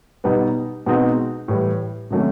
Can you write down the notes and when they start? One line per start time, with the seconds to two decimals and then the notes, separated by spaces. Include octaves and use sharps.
0.24 B2 G3 B3 D#4
0.86 B2 G#3 C4 D#4 F#4
1.48 A2 E3 G3
2.11 C3 D#3 F#3 A3 C#4